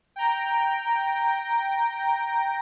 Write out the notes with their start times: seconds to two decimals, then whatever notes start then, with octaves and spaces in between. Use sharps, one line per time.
0.16 G5 A#5